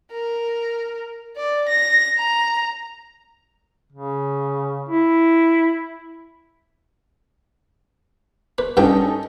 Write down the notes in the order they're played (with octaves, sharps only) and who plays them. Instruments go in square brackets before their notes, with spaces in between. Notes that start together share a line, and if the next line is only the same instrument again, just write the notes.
[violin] A#4
D5
A#6
A#5
[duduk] C#3
E4
[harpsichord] B4
[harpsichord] G2 B4 G5 [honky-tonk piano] C#4 D#4 A4